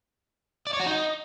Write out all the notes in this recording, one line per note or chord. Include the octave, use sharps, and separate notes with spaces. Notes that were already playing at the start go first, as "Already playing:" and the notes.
D5
C#5
F#4
D#4